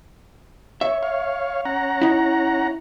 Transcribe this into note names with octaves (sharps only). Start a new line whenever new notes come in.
C#5 E5
C#5 F5
C#4 F#5 A#5
D#4 E4